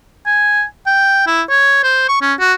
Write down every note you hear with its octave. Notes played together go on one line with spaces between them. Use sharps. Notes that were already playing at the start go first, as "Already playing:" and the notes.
G#5
G5
E4
C#5
C5
C#6
C#4
F#4